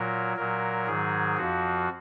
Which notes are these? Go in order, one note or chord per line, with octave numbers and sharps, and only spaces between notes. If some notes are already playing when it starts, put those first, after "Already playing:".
Already playing: A#2 F#3 A#4
A#2 F#3 A#4
G#2 D#3 F#3 G#4
F2 F3 F#4